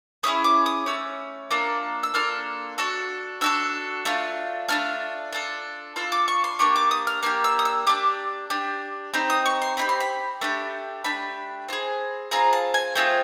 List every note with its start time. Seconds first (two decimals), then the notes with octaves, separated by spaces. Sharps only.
0.23 A3 C#4 E4 G#4 D#6
0.44 D6
0.66 D#6
0.86 A3 C#4 E6
1.51 A#3 D4 F4 A4
2.03 E6
2.14 A#3 D4 F4 A4 F6
2.78 D4 F#4 A4
3.41 D4 F#4 A4 E6
4.05 A3 D4 F4
4.69 A3 D4 F4 F6
5.33 D4 F4 A4
5.96 D4 F4 A4 E6
6.12 D6
6.28 C#6
6.44 C6
6.59 A#3 D4 G4 C#6
6.76 D6
6.91 D#6
7.07 F6
7.23 A#3 D4 G4 F6
7.44 E6
7.59 D#6
7.65 E6
7.87 D4 G4 D6
8.50 D4 G4
9.14 C4 D#4 G4
9.30 D#6
9.46 C#6
9.62 C6
9.77 C4 D#4 G4 B5
9.89 C6
10.00 B5
10.41 A3 D4 G4
11.04 A3 D4 G4 B5
11.69 C4 F4
11.73 G#4
12.31 C4 F4 G#4 A#5
12.53 A5
12.74 G#5
12.95 A3 C4 F4 G#4 G5